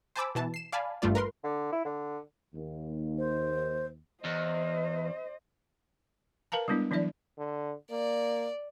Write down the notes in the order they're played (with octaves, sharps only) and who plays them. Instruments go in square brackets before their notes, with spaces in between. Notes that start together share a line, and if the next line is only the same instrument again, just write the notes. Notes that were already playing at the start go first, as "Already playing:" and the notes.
[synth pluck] C5 G#5 A5 B5 D6 E6
B2 E3 A5
C7 E7
D5 F5 G#5 A5 B5
G#1 G2 G3 A3 F4 D5
A#4 B4 C6
[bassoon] D3
E4
D3
[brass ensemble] D#2
[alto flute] C5
[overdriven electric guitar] E2 [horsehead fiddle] C5 D#5
[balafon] A#4 B4 F5 A5 A#5
G3 G#3 B3 D4 E4
E3 F#3 D4 E4 D5 E5
[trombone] D3
[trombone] A#3 [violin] D5